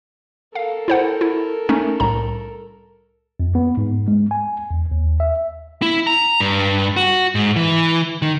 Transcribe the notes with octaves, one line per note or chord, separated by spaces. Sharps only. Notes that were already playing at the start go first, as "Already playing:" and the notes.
A4 A#4 F5
E4 C5 F#5
E4
A3 C#4 D#4
C2 A2 A#5
F2
B3
G#2
G#3
G#5
E2
D#2
E5
E4
A#5
G2
F#4
G#2
E3
D#3